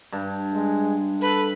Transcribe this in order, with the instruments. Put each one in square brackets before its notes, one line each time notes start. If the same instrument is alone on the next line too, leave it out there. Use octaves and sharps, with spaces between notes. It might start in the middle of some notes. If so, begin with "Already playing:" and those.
[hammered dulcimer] G2
[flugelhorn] G#3
[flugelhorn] A4 [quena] B4